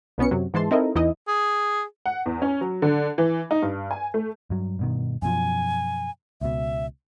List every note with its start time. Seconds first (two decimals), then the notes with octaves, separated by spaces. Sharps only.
0.18 C2 B2 B3 C#4 C#7
0.31 F#2 C3 F#3
0.54 G#2 E3 G#3 A5 C6
0.71 C4 D#4 E4 A4 A#4 D#5
0.95 E2 E3 D#4 E4 D#5
1.28 G#4
2.06 F#5
2.26 E2
2.42 C#4
2.61 F#3
2.82 D3
3.18 E3
3.51 D#4
3.62 G2
3.91 G#5
4.14 A3
4.50 G2 F#3
4.79 G2 B2 D#3
5.22 F#2 B2 F3 G#5
6.41 C#2 B2 E5